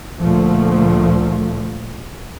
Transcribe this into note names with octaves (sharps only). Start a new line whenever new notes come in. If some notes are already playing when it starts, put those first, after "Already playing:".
D2 A#2 F3 A3